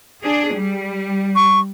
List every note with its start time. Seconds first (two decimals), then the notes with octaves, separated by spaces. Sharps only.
0.23 D4 G#4
0.53 G3
1.36 C#6